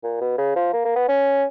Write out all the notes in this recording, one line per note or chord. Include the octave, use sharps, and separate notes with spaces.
A#2
B2
C#3
F3
A#3
A#3
B3
C#4